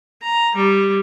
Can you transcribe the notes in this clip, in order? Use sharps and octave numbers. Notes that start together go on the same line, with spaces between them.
A#5
G3